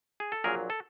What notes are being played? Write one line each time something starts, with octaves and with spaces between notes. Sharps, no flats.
G#4
A4
A#1 A#2 F#3 G#4 A#4
A4